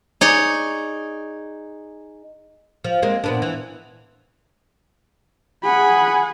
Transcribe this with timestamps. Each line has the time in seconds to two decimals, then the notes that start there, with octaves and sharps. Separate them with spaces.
0.21 D#4 G#4 C#5 D5
2.84 F3
3.02 G#3 A#3 C4
3.24 A#2 B3 D4
3.42 E3
5.64 G#4 F#5 B5